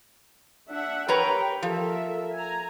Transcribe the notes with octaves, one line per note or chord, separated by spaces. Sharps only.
D4 E5 F#5
G4 A#4 B4 C#5 G5 A#5
F3 A4 A#4 E5
G#5 A#5